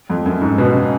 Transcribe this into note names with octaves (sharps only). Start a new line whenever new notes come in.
F2
F#2
G#2
B2
C#3